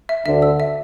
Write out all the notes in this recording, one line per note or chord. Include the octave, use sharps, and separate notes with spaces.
E5
D2 D3 E5
E6
E5